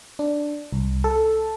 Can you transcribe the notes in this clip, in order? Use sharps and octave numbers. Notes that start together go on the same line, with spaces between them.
D4
C2
A4